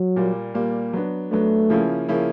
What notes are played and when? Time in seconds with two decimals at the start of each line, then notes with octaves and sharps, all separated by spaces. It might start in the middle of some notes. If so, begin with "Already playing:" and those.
Already playing: F#3
0.16 A#2 G3 A#3
0.54 A#2 G3 A#3
0.93 F#3 B3 D4
1.31 F#3 A3 B3 D4
1.70 C#3 F3 A#3 C#4 E4
2.08 C#3 F3 A#3 C#4 E4